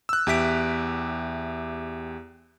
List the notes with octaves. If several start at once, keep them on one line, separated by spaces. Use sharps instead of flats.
E6 F#6
E2 G4 E5 B6 D7